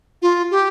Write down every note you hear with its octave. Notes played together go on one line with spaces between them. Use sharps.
F4
G4